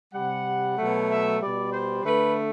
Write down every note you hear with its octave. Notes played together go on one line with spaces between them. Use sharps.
C3 G3 F#5
B2 F#3 A3
E5
B2 G3 D5
C5
D3 A3 B4